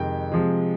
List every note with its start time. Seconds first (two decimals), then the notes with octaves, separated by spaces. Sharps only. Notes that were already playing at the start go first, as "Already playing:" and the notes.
Already playing: F2 C3 D#3 G#3 G5
0.32 C3 F3 G#3